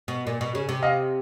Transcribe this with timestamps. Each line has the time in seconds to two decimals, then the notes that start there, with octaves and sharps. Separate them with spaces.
0.08 B2
0.27 A#2
0.41 B2
0.55 C#3
0.69 C3
0.82 D#5 F5